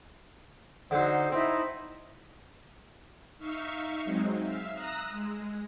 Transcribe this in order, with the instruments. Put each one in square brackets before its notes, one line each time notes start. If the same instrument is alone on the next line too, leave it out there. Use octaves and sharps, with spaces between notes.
[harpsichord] D3 F#3 [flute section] D#4 C5
[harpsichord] C4 [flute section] D#4 E4
[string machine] D#4 E5 F5 C#6
F#3 G#3 C4 D#4
E5 F5
A#5 D#6 E6 F#6 A#6
G#3